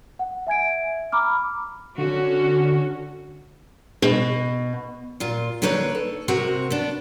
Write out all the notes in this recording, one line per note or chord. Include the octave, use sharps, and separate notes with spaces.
F#5
E5 G#5 G#6 D7
A#5 B5 D6 F6
D3 C#4 F#4
B2
A#2 F4
D3 A#3 D#4 B4 C#5 F5
A4
C3 C4 F#4 A#4
B3 D4